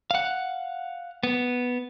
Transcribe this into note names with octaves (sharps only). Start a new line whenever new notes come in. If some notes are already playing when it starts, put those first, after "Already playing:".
F5 F#5
B3